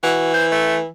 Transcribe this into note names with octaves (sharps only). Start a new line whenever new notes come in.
E3 F#4
C5
A3